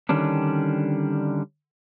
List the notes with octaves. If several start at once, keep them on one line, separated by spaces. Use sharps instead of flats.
D3 D#3 G3 C#4 D4